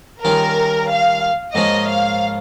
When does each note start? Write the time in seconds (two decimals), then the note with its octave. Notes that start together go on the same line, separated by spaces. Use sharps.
0.23 D#3 G3 C#4 F4 A#4
0.90 F5
1.54 G#2 F3 A#3 C#4 D#5
1.87 F5